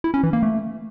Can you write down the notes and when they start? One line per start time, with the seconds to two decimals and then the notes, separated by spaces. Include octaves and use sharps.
0.04 E4
0.14 C#4
0.23 E3
0.33 A#3
0.43 A3